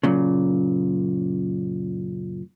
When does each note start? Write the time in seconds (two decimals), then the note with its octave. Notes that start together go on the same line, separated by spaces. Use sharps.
0.03 F#2 A#2 C#3